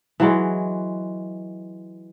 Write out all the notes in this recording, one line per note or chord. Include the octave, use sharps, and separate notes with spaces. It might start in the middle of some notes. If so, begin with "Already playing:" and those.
E3 F#3 G#3